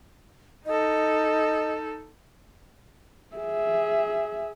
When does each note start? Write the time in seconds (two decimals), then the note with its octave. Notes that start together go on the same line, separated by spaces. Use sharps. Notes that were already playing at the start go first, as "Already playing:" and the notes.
0.66 D#4 A4 D#5
3.36 G#4 E5